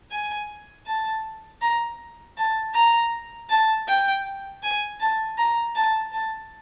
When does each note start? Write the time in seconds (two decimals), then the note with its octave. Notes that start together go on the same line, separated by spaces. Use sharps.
0.11 G#5
0.86 A5
1.62 A#5
2.37 A5
2.74 A#5
3.50 A5
3.88 G5
4.63 G#5
5.00 A5
5.38 A#5
5.75 A5
6.12 A5